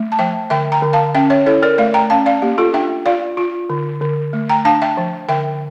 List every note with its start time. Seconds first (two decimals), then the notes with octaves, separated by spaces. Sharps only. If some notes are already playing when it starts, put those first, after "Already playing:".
Already playing: A3
0.12 A5
0.19 F3 E5 G5
0.50 D3 E5 G5
0.72 G5 A#5
0.83 D3
0.93 F5 A5
1.15 C#4 E5 G5
1.30 C#5 E5
1.46 E4 A4 C#5
1.63 A#4 D5
1.78 A3 D5 F5
1.94 G5 A#5
2.10 C#4 F5 A5
2.26 D5 F5
2.42 A#3 G4
2.58 F4 A4
2.74 D4 E5 G5
3.06 F4 D5 F5
3.37 F4
3.70 D3
4.01 D3
4.33 A3
4.49 G5 A#5
4.65 D4 F5 A5
4.82 E5 G5
4.97 F3
5.29 D3 E5 G5